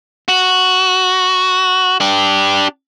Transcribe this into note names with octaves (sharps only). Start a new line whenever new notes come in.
F#4
D4 G4